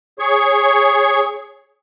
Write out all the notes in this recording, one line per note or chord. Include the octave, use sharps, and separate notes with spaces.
G#4 C#5 C#6